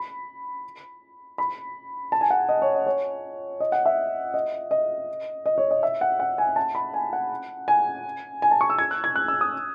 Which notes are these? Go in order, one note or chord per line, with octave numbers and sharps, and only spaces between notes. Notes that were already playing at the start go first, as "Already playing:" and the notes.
Already playing: B5
B5
A5
G#5
F#5
D#5
C#5
D#5
C#5
D#5
F#5
E5
D#5
D#5
D#5
C#5
D#5
E5
F#5
F#5
G#5
A5
B5
G#5
F#5
G#5
G#5
A5
C#6
E6
G#6
F#6
G#6
F#6
E6
D#6